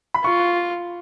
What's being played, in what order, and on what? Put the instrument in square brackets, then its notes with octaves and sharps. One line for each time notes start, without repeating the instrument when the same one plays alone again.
[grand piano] B5
[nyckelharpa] F4 [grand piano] C#6